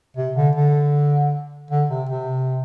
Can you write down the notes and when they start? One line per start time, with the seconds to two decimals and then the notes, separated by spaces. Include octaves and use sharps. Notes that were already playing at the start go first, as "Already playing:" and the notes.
0.17 C3
0.36 D3
0.55 D3
1.71 D3
1.89 C3
2.09 C3